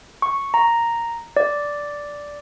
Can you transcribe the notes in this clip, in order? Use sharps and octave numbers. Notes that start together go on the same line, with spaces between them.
C#6
A#5
D5